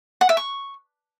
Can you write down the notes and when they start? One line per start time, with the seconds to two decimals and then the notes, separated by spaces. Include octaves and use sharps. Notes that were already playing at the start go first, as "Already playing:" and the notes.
0.21 F#5
0.29 E5
0.37 C#6